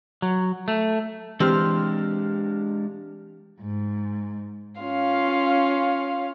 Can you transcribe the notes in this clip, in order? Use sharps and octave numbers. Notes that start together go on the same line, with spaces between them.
F#3
A3
E3 G#3 C4 D4 G4 F6
G#2
C#4 F4 F5